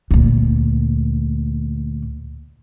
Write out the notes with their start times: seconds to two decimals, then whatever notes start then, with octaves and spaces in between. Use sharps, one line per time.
0.11 D2 A#2